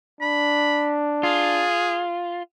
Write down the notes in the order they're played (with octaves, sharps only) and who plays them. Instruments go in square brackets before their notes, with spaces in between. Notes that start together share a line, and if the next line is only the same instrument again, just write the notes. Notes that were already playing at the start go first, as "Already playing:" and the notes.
[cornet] D4 [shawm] B5
[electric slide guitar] F4 [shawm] G#4